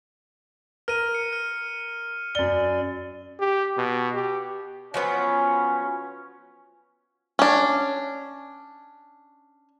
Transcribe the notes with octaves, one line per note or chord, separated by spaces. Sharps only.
A#4 F6 D#7
C#7
F6
F#2 D5 G7
G4
B2
G4
F3 F#3 B3 C#4
C#4 D4